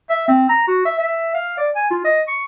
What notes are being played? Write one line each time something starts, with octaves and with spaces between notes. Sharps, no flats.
E5
C4
A#5
F#4
E5
E5
F5
D5
G#5
F4
D#5
C#6